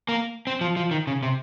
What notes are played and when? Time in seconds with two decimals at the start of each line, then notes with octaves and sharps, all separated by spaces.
0.09 A#3
0.47 C4
0.61 F3
0.76 F3
0.91 D#3
1.07 C#3
1.23 C3